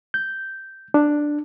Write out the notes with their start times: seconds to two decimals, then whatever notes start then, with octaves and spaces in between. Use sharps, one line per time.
0.14 G6
0.94 D4